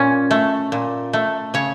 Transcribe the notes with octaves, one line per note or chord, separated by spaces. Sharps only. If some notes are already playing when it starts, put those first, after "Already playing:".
Already playing: A#2 C#4
A3
A#2
A3
C#3 C#5